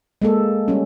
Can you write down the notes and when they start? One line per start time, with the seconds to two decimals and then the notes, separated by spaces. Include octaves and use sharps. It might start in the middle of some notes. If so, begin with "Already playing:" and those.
0.22 G#3 A#3 A4
0.68 G3 C#4